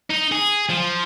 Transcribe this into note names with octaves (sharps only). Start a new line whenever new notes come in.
D#4
G#4
F3